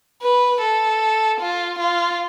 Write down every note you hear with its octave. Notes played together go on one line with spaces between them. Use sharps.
B4
A4
F4
F4